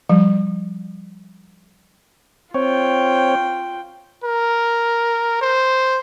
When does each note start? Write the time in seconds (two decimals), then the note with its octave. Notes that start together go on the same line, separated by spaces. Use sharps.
0.09 F3 G3
2.54 C4 F4 C#5 G5
4.24 A#4
5.41 C5